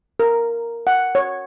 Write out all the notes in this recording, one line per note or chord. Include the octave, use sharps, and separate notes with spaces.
A#4
F#5
C#5